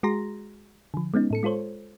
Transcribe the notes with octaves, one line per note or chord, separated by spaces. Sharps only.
G#3 F#4 G#4 A#5 C6 A#6
D3 F3
G#3 B3 C#4 D#4
A2 A4 C#7
G#3 F4 A4 C5 C#5